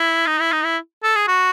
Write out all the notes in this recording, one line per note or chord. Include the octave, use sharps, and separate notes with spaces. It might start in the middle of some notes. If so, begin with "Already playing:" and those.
Already playing: E4
D#4
E4
D#4
E4
A4
G#4
F#4